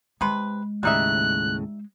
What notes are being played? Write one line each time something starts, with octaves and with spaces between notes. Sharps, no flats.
C3 G#3 B4
D#2 A2 C#3 G3 D#4 E5 F#6